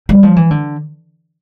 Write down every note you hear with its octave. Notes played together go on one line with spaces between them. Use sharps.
G3
F3
E3
D3